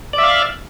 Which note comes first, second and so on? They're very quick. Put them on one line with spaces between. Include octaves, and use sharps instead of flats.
D5 E5 F5